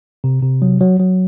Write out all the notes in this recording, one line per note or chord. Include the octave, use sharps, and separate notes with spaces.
C3
C3
F#3
F#3
F#3